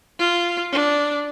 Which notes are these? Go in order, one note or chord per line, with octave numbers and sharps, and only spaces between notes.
F4
D4